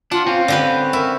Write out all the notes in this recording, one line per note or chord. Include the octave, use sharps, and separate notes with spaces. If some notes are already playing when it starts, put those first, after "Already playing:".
D4 F4 F#5
C4 C#4 F5
D3 G4 B4
E4 A#4